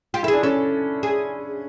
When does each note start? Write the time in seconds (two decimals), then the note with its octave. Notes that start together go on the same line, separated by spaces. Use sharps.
0.14 F4 G4
0.23 E4 A4
0.28 D4 G#4
0.43 C#4 A4
1.03 G#4